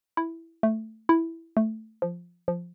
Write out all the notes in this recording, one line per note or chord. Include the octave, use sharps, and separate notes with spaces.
E4
A3
E4
A3
F3
F3